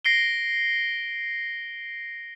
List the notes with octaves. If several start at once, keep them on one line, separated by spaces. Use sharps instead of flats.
A#6 C7 D7 G7